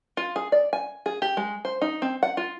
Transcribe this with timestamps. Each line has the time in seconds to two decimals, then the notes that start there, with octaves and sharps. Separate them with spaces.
0.17 F4
0.36 G#4
0.52 D5
0.73 G#5
1.06 G#4
1.22 G4
1.37 G#3
1.65 C5
1.82 D#4
2.02 C4
2.23 F#5
2.37 F4